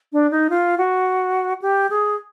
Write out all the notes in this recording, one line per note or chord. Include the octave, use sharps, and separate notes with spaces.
D4
D#4
F4
F#4
G4
G#4